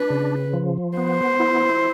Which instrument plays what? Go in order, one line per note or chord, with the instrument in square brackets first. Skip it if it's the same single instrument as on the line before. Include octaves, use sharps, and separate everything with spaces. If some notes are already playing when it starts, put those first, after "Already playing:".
Already playing: [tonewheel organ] D4 [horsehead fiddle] B4
[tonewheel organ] C#3
F3
[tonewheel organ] B3 [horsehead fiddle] C5
[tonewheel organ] E4